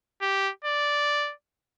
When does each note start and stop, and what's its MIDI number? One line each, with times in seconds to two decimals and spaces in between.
0.21 0.50 67
0.64 1.33 74